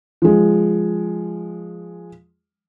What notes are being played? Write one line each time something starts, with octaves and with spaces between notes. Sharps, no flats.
F3 G#3